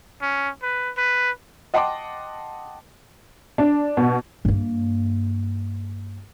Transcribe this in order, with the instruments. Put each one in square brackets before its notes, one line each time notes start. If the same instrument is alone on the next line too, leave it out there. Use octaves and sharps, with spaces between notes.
[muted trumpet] C#4
B4
B4
[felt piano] D#5 F#5 G5 A5 C6 D6
[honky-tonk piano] D4
B2
[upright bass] G2 A#3